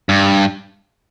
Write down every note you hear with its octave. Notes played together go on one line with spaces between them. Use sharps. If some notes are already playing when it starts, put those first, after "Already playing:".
G2